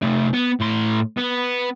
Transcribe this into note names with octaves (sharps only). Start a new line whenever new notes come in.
C3 A3
B3
A2 C6
B3